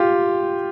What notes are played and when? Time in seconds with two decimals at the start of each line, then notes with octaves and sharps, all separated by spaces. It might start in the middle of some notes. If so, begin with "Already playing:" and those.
Already playing: F4 G4